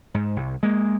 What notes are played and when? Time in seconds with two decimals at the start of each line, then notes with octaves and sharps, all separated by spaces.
0.14 G#2
0.36 C2
0.63 G#3 A#3